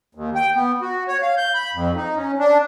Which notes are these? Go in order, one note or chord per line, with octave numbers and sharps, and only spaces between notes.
D#2
G5
B3
F#4
C#5
F5
G6
B5
F2
D#4
C#4
D4